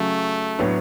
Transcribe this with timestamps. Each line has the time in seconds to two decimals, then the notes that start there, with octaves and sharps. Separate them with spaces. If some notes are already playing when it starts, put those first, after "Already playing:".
Already playing: C#3 F#3 A3 C#4
0.59 A2 F#3 B3 D4